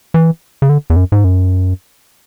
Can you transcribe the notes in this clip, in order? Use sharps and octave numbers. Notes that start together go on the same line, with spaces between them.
E3
C#3
D3
E2
F#2
G#2
F#2